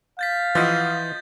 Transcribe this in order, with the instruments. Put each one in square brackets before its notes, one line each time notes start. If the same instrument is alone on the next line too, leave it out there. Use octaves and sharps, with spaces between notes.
[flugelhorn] F5 [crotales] G6 A6 B6
[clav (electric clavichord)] E3 [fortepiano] F3 D#5 F#5 [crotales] G6 A6